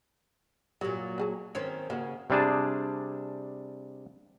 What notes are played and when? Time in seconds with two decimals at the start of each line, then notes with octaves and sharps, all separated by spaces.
0.81 A#2 F#3 G4 A4
1.18 F#4 G#4 A5
1.55 D#3 C4 C#4 B4
1.90 C#3 A#3 F#4 F#5
2.30 C3 G3 D4 G#4 A5